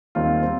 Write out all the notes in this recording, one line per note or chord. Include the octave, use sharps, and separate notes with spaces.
D#2 D#3 G3 C4 F4
G3 C4